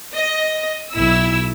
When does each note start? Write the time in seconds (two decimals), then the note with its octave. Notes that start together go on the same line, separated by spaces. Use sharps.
0.16 D#5
0.93 B1 E4 E6